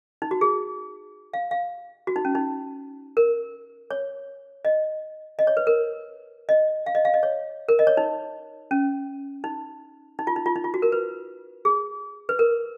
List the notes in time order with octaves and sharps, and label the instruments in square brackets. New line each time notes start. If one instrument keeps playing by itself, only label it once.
[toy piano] D#4
F#4
G#4
F5
F5
F#4
D#4
C#4
D#4
A#4
C#5
D#5
D#5
C#5
B4
A#4
D#5
F5
D#5
F5
D#5
C#5
A#4
D#5
C#5
D#4
C#4
D#4
D#4
F4
D#4
F4
D#4
F4
F#4
A#4
B4
G#4
B4
A#4